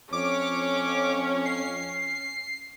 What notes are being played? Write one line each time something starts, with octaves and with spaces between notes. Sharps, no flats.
F2 C#4 C#5 D6
C7